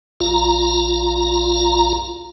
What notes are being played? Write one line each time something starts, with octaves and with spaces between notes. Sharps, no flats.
A#1 F4 A#5